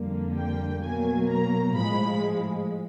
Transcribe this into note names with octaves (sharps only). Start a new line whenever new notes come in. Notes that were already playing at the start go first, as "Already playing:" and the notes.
Already playing: F2 D3 G3 A#3
G5
B2 F#3 A#3 G#5
A#5
A2 F3 G#3 B5